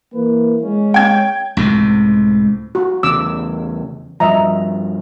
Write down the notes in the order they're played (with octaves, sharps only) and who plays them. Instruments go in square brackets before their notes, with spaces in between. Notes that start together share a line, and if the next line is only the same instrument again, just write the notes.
[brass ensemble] E3 A#3 B4
G#3 C#4
[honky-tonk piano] G5 G#6
[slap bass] C#2 A2 C3
[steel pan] F#4
[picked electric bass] E2 C#3 [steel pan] D6 E6
[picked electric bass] G2 F3 [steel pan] D#5 E5 A#5